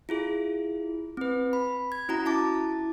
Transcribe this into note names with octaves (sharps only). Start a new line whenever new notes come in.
E4 F4 G#4
C4 B4
B5
G#6
C#4 E4 F#4 A#5
E4 A5 D6 A6